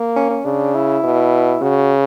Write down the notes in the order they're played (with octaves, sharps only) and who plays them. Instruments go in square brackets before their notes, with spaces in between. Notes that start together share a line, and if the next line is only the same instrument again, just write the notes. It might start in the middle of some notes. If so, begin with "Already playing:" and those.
Already playing: [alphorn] A#3
[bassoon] C#4
C#4
[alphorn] C#3 [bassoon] D4
[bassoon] E4
[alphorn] B2
[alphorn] C#3 [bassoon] F#4